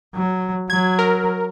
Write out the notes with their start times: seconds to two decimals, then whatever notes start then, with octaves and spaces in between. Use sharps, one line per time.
0.15 F#3
0.70 F#3 G#6
0.99 A#4